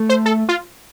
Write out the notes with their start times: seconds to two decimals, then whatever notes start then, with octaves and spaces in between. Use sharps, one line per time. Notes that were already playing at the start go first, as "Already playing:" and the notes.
Already playing: A3
0.09 C5
0.26 A4
0.49 F4